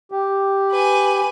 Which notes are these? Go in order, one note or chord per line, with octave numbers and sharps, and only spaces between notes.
G4
B4 G#5